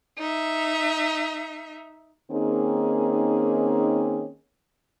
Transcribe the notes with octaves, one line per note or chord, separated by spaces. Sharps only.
D#4 E5
D#3 A#3 C4 C#4 D#4 G#4